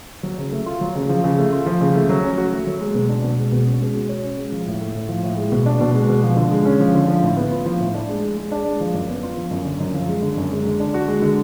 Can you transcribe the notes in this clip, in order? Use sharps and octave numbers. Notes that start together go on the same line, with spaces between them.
F#3
C#3
A3
F4
F#3
C#3
F3
C#3
A3
F4
F3
C#3
A3
F#3
C#4
F#4
A3
F#3
G#3
B2
D4
B2
G#3
B2
C#4
G#3
F#4
C#5
C#4
G#3
F3
A2
A3
A2
F3
A2
G#3
B2
D4
B2
G#3
B2
F3
D3
G#3
C#4
F3
D3
F3
A2
B3
F4
F3
A2
D4
G#3
G#4
G#3
D4
G#3
F3
F#2
B3
F4
F3
F#2
D3
F#2
F3
G#3
D3
F#2
G#3
D3
D4
F#4
G#3
D3